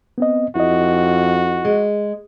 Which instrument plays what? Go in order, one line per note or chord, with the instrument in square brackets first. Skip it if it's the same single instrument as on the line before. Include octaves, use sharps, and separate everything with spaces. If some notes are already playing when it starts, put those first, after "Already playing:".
[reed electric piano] B3 C4 D#5
[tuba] F2 [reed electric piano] E4 D#5 [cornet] F#4
[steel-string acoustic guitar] G#3